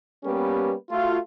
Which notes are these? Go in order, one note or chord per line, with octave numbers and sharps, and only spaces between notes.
G3 A#3 B3 C#4 G4 B4
A3 F4 F#4